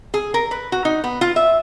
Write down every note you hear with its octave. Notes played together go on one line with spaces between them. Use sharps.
G#4
A#4
B4
F#4
D#4
B3
F4
E5